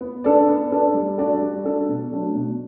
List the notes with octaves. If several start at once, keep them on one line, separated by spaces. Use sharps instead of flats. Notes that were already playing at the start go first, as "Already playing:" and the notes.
B3
D4 A4 D5
B3
D4 A4 D5
G3
D4 F#4 A4 D5
G3
D4 F#4 A4 D5
B2
F#3 A3 D4 F#4
B2